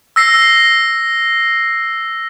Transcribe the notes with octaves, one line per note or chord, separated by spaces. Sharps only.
E6 A#6 C7